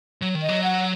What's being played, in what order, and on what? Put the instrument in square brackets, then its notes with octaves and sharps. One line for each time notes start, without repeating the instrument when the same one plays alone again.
[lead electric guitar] F#3
D#3
[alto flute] D#5
[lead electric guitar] F#3
[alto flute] F#5